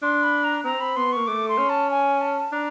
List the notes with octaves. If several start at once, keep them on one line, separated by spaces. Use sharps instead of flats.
D4 C6
B5
A#5
C4 A#5
B5
B3 C6
A#3 C#6
A3 D6
C6
C#4
A5
G#5
A5
D4 A#5